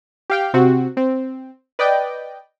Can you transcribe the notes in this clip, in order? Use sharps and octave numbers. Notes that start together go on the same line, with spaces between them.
G4 F5 G5
C3 C4 F#4
C4
B4 D5 D#5 G5